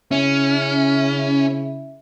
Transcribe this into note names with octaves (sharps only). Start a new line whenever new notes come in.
C#3 C#4 E4